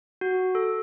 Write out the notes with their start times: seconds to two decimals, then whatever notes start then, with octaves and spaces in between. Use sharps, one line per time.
0.21 F#4
0.55 A4